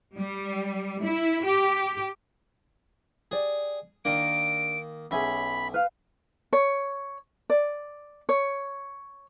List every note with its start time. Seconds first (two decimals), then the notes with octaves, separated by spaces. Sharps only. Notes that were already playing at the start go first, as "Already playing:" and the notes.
0.15 G3
1.02 E4
1.43 G4
3.31 G4 G#4 D5
4.05 D#3 A#3 D4 D7
5.11 B1 C#4 G#4 E5 B5
5.74 B4 F5 F6
6.53 C#5
7.50 D5
8.29 C#5